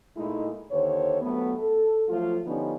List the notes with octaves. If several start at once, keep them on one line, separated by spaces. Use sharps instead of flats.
A#2 G#3 A3 D#4 E4
D#2 D3 C5 C#5
G2 F#3 A3 B3
A4
F3 F#3 A3 F4
D3 F3 G3 B3 C#4 D#4